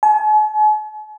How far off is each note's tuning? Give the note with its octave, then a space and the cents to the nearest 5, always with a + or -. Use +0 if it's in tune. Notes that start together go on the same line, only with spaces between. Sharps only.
G#5 +45